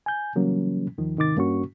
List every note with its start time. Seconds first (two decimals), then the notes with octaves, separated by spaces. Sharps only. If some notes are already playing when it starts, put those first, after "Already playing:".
0.06 G#5 G6
0.35 C#3 E3 F#3 G3 A#3 C#4
0.98 D#2 D#3 F3
1.17 G#2 C3 D#3 D#4 D6 A6
1.37 G2 A#3 C#4 F#4 C#6